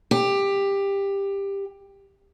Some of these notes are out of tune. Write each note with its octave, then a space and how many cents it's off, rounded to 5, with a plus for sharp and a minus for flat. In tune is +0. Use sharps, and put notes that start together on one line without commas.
G4 +15